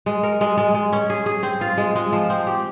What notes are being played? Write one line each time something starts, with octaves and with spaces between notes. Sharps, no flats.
G#3
A#4
G#3
G#3
G#3
C#4
G#4
G#4
C4
F4
G#3
G#3
F3
C4
G4